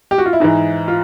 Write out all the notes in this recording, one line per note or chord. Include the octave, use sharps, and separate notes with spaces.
G4
F#4
F4
E4
G#2 E3 D#4
F4